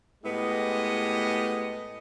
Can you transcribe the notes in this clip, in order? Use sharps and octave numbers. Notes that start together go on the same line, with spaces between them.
A2 G#3 B3 G4 D#5